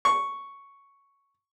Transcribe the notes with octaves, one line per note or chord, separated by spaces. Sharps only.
C#6